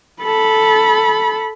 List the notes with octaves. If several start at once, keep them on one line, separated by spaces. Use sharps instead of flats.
A4 B5